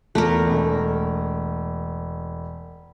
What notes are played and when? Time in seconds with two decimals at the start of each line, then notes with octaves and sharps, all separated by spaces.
0.15 E2 A3 A#4
0.47 E1